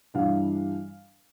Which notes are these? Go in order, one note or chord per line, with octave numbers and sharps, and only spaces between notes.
G2 E3 G3 D4 F5